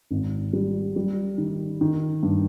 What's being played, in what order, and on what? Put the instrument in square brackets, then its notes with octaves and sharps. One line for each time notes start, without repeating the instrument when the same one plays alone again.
[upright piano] G#1
G3
G3
D#3
D#3
G2